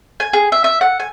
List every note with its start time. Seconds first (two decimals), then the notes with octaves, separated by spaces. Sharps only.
0.20 G#5
0.33 G#4
0.52 E5
0.64 E5
0.81 F#5
1.00 G#5